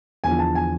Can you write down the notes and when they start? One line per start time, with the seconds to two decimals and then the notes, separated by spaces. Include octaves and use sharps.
0.24 E2 D3 F3 G#5
0.39 A5
0.55 G#5